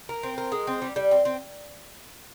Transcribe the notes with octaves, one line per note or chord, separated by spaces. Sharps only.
A#4
C4
A#4
G#3
C4
G3
G3
C4
C4